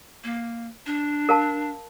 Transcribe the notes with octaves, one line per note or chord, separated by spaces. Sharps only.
A#3
D4
A#4 F5 A5